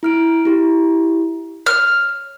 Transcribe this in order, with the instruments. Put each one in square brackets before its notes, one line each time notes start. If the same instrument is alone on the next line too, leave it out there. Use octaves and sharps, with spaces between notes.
[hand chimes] E4 F6 D7
E4 G4
[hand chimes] C#5 [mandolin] F6